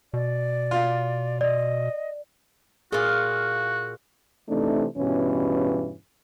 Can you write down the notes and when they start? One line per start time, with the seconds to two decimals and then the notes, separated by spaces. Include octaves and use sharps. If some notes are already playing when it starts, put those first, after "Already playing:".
0.14 B2 D5
0.71 F4
1.41 D5 D#5
2.92 A#2 F4 F#4 G#4
4.49 C3 E3 A3 C4 D4 D#4
4.97 E2 G2 B2 E3 C#4